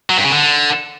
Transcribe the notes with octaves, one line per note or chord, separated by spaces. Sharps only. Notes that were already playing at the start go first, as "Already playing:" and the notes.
F#3
G2
C#3
D3